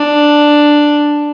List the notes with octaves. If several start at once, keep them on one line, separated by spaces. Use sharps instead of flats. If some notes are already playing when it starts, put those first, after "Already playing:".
Already playing: D4